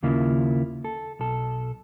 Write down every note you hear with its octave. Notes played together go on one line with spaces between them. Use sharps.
D#2 C#3 A#3 E4 F4
A4
B1 A4